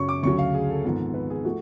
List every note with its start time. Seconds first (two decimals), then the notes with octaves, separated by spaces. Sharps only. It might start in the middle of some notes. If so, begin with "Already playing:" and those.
Already playing: F#2 C#3 F#3 C#6
0.09 D6
0.23 D2 C#3 F#3 C#6
0.39 F5
0.54 G#4
0.70 A4
0.84 G#1 G#2 F3 B3
1.14 B4
1.30 G#4
1.44 F3 A3 F#4